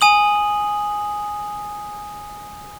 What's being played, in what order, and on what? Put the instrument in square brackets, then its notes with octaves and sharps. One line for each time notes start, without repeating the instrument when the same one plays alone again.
[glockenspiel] G#5 D#6 F#7